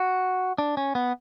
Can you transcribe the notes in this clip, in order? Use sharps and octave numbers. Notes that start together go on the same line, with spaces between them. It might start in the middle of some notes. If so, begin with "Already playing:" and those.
Already playing: F#4
D4
C#4
B3